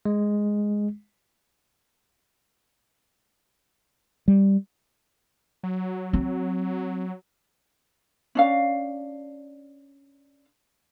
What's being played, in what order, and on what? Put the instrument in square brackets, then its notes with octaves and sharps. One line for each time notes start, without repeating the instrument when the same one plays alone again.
[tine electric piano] G#3
[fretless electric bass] G3
[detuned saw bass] F#3
[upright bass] C4
[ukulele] C#4 D4 F5